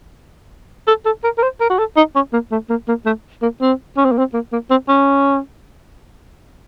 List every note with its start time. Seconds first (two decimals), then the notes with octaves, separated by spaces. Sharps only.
0.87 A4
1.05 A4
1.24 A#4
1.38 A#4
1.43 C5
1.60 A#4
1.70 F#4
1.79 A4
1.96 D#4
2.15 C#4
2.33 A#3
2.52 A3
2.70 A#3
2.88 A#3
3.06 A3
3.42 A#3
3.61 C4
3.97 C#4
4.05 C4
4.12 A#3
4.18 C4
4.34 A#3
4.52 A#3
4.70 C4
4.88 C#4